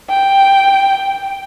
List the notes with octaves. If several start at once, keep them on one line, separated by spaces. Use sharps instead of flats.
G5